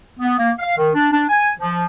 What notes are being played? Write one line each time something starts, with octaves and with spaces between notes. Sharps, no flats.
B3
A#3
F5
D#3
D4
D4
G#5
F3